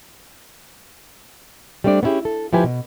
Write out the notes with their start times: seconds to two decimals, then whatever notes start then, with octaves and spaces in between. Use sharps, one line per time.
1.84 G3 A3 C4 D4 D5
2.03 B3 C#4 D4 E4 G4 G#4
2.25 A4
2.52 D2 F3 E4 G4 B4 G#5
2.64 B2